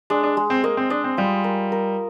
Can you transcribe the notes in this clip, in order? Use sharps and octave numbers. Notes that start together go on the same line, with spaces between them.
G#3 D4
D4
G#3
C4
A#3 D#5
C4
D4 D#5
C4
G3 F4
A#4
A#4